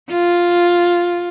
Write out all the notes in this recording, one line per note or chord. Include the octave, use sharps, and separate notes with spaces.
F4